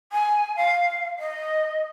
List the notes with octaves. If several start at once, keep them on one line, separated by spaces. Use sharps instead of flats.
G#5
F5
D#5